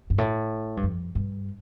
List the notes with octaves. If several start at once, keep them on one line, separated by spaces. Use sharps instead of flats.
G2
A2
G2
F2
G2